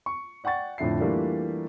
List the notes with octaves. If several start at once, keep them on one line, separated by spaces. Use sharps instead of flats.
C#6
D5 F#5 G5 C#6 A6
F2 A2 D3 E5 C7
E3 G3 A3 A#3 D4 F4